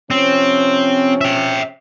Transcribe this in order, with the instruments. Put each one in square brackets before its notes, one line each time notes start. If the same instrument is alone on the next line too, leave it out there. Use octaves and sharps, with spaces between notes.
[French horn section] C3 F3 C#4 [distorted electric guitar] C4
[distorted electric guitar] E5 G5